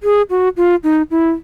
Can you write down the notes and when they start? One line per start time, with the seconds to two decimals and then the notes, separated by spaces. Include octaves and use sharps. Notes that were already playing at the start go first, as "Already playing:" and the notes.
0.03 G#4
0.30 F#4
0.57 F4
0.84 D#4
1.11 E4